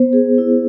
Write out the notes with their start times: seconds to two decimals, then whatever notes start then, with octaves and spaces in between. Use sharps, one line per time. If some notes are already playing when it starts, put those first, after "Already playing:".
Already playing: B3 C5
0.13 G#4
0.38 E4